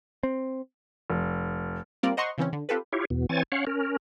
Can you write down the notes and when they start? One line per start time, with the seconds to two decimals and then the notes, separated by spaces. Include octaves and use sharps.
0.23 C4
1.10 F1
2.03 G3 A#3 C4 F4 A#4 D5
2.17 C5 D#5 F#5 A#5 C6 C#6
2.38 C#3 E3 C4 C#4
2.53 D3
2.69 C4 F4 G4 A4 B4
2.93 E4 F4 G4 C#5
3.10 E2 B2
3.29 E3 C4 C#5 G#5 A6
3.52 C#4 C#5 F5 F#5
3.67 C#4 A#4